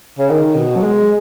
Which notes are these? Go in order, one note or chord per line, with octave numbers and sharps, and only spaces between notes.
C#3
D#3
B2
F#3
G#3